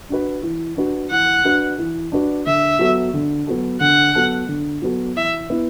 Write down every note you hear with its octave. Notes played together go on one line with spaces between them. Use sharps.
D4 F#4 B4
E3
D4 F#4 B4
E3 F#5
D4 F#4 B4
E3
D4 F#4 B4
D3 E5
F#3 B3 F#4 A4
D3
F#3 B3 F#4 A4
D3 F#5
F#3 B3 F#4 A4
D3
F#3 B3 F#4 A4
E3 E5
B3 E4 B4